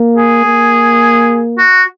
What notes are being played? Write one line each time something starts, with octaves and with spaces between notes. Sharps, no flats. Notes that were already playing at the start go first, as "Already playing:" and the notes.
Already playing: A#3
G#4
A#3
F#4